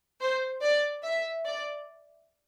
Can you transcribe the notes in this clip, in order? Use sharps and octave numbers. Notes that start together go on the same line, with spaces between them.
C5
D5
E5
D5